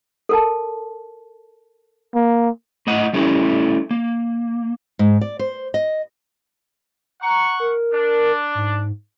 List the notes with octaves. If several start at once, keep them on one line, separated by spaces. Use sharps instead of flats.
A4 A#4 A5
A#3
A2 A3 D#5 F#5
G3 A3 C#4 E4 A4
A#3
G#2
D5
C5
D#5
F#5 A#5 C#6
A#4
D4
G#2